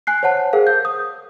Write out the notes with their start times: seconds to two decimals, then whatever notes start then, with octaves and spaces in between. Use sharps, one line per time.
0.07 G#5 F#6 C7
0.23 C5 C#5 F#5 A5
0.53 G#4 A#4 C5 F5
0.67 G6
0.85 D#6